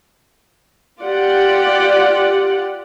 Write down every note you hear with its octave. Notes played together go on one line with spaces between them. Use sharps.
F4 G4 D5 F#5